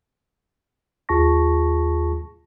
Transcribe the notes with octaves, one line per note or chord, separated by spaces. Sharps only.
D#2 F4 G#4 A5 C#6 A#6